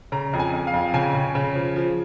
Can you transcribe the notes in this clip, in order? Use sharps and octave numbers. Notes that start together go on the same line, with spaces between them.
C#3 A#5
F2
G#5
F2
F5
F2
C#3 G#5
C#3
C#3
F3
F3